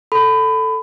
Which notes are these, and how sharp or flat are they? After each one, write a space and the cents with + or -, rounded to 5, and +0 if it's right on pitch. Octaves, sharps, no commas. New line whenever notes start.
A4 +5 B5 +25